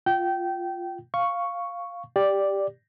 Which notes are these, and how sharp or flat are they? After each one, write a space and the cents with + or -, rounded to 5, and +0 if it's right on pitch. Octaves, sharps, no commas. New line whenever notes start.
F4 +0 G5 -20
F5 +0 C#6 +0
G4 +5 D5 +0